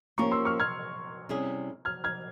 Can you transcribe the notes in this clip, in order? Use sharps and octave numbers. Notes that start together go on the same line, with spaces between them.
F3 A#3 C#4 G4 A#4 A#5 C#6
C6 E6
C#6 F6
F6 G#6
C3 G3 C#4 E4 G#4
F6 G#6
F6 G#6